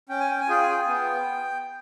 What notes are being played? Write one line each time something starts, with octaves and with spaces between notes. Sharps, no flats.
C#4 G5
G#5
G5
G#5
F4 G#4 G5
G#5
G5
G#5
B3 G5